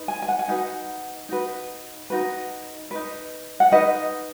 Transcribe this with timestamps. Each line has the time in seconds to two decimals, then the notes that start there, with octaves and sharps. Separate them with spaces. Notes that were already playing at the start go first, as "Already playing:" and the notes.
Already playing: D#4 B4
0.08 G#5
0.22 G#5
0.28 F#5
0.39 G#5
0.48 D#4 F#4 B4 F#5
1.29 D#4 F#4 B4
2.10 D#4 F#4 B4
2.91 D#4 B4
3.60 F#5
3.72 D#4 B4 D#5